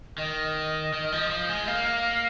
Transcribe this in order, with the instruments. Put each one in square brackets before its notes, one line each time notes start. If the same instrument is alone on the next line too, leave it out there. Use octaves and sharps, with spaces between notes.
[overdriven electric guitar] D#3 [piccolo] D#5
[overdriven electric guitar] D#3
F3
F3
G#3
[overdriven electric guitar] A#3 [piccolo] F5